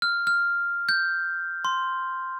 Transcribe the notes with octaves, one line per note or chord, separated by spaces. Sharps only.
F6
F6
G6
C6